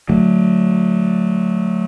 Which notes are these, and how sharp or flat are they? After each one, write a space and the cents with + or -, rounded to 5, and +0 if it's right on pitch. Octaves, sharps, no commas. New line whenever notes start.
D3 +0 F#3 -15 A3 +0